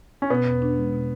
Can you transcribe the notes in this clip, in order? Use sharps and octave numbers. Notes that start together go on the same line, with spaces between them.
C#4
B2 B3
E2
D4
G#3
B2